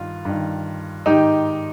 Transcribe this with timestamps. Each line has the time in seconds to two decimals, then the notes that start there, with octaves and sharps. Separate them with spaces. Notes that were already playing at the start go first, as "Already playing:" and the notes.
Already playing: G2 D#3 F4
0.25 G2 D#3
1.06 G#2 D#3 D#4 G4